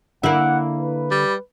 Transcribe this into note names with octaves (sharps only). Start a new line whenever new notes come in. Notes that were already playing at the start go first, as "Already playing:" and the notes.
D3 A#3 E4 F#5
B4
G3